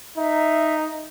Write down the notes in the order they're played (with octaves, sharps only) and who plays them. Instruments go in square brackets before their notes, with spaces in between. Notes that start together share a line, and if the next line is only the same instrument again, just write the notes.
[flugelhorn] D#4 [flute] E5